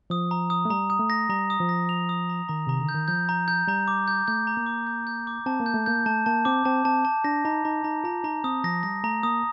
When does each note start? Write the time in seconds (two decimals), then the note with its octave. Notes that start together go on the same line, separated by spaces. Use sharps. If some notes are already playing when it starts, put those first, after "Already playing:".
0.10 F3 D#6
0.31 A#5
0.50 D#6
0.65 A3
0.70 G3 A#5
0.90 D#6
1.00 A3
1.10 A#6
1.29 G3 A#5
1.50 D#6
1.60 F3
1.69 A#6
1.89 F7
2.09 D#6
2.29 A#5
2.49 D#3 A#5
2.67 C3 A#5
2.80 D3
2.89 G6
2.94 D#3
3.08 F3 G6
3.29 A#5
3.48 G6
3.68 G3 A#5
3.88 D6
4.08 G6
4.28 A3 G6
4.47 A#5
4.57 A#3
4.66 D6
4.87 G6
5.07 G6
5.27 D6
5.46 C4 A5
5.60 A#3
5.66 G6
5.74 A3
5.86 A#3 G6
6.06 A3 A5
6.26 A#3 A5
6.45 C4 D6
6.65 C4 A5
6.85 C4 A5
7.05 A5
7.24 D4 A#6
7.45 D#4 A#5
7.65 D#4 A#5
7.84 D#4 A#5
8.04 F4 A#5
8.24 D#4 A#5
8.44 C4 D#6
8.64 F3 A#6
8.83 G3 A#6
9.04 A3 A#5
9.23 A#3 D#6